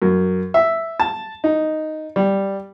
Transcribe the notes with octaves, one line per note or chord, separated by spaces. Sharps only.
F#2
E5
A5
D#4
G3